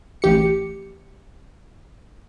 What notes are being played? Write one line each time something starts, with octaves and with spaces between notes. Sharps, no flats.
A1 G4 C#7